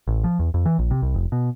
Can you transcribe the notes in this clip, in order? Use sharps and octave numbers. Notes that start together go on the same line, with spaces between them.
A1
F3
E2
F2
E3
A#1
C3
C2
F1
B2